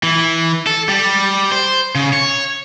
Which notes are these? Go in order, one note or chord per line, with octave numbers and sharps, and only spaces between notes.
E3
A4
G3
C5
C#3
C#5